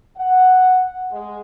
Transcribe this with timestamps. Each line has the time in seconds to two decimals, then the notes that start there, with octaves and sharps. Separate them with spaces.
0.17 F#5
1.12 G#3